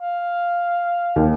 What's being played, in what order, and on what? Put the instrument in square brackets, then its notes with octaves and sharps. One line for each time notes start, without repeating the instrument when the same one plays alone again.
[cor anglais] F5
[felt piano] D#2